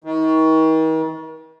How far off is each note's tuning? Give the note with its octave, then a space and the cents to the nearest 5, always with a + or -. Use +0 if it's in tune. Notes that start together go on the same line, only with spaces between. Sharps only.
D#3 +40